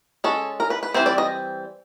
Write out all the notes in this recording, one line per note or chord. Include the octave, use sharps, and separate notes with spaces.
G#3 C#4 A4
A#4
B4
B4
E3 G3 C4 C5
D5
D#5